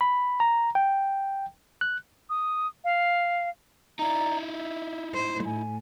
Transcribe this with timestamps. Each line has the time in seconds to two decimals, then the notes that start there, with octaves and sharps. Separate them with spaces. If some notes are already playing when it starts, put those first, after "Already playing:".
0.01 B5
0.40 A#5
0.75 G5
1.81 F#6
2.30 D#6
2.84 F5
3.99 D#4 E4 D5 A#5
4.52 E5
5.14 C5
5.44 A2 G#5